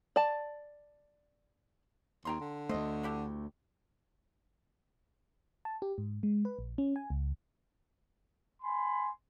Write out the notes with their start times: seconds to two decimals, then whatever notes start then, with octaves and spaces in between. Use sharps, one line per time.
0.16 D5 A5
2.25 D#2 G5 A#5 C6
2.40 D3
2.69 D2 A3 C5 D#5
3.03 D4 E4 G4
5.65 A5
5.82 G4
5.98 G#2
6.23 G#3
6.45 B4
6.59 A#1
6.78 C#4
6.96 G#5
7.10 C#2
8.62 G#5 B5 C6